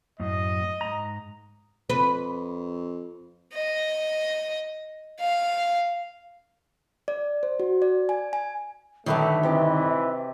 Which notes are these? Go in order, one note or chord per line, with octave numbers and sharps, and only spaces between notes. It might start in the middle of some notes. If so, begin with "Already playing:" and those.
F#2 A2 D#5
G#2 A#5
F2 B4
D#5
F5
D5
C5
F#4
D5
G#5
G#5
G2 D3 D#3 F#3 A3 G4 B4 E5
C3 E3 D5 D#5